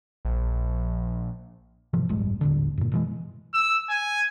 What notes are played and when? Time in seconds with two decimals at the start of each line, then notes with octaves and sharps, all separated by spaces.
0.25 A#1
1.93 G#2 C3 E3 F3
2.09 E1 A1 G2 G#3
2.41 D#1 A1 D3
2.78 F#2 A#2
2.92 B2 E3 G#3
3.54 E6
3.89 G#5